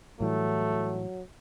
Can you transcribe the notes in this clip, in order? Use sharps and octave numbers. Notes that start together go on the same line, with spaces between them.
A2 E3 F#3 G3 A3